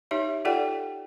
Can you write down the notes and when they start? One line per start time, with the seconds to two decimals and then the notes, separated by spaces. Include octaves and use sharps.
0.11 D#4 G4 C#5 E5
0.45 F4 G4 A4 D5 F#5 G5